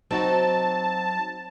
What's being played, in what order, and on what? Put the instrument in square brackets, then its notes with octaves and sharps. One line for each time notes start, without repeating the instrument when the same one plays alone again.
[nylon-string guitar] F#3 D#4 F#4 [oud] C4 [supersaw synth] A5